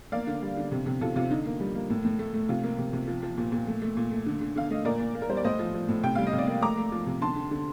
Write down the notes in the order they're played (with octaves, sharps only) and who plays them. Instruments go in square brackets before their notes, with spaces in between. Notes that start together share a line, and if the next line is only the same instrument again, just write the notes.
[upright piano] A#3 D5 F5
D3
G3
D3
C3
C3
C3 F4 A4
C3 F4
D3 D#4
A#3
G3
A#3
A2
A2
A3
A3
C3 F4
A#3
C3
C3
F3
F3
A#2
A#2
A3
A3
A#2
A3
D3
D3
D3 F5
A3 D#5
A#2 A#4 D5
A#2
A#3
A#4
G3 C5
D5
A2 C5 D#5
F3
F3
A2
C3 G5
G3 F5
D#5
C3
D5 F5
A#3
A3 A#5 D6
A3
F3
C3
D3 A5 C6
D3
D3